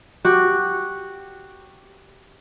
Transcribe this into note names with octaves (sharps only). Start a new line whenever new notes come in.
F#4 G4